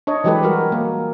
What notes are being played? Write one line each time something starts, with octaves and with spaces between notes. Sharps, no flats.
D4 C#5 D#5
E3 F#3 G#3 G4 A4 B4
G3 F#4 A#4
A#3